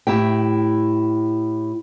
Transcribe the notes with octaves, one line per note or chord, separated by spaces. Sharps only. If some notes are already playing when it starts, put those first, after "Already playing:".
A2 E4 G4 G5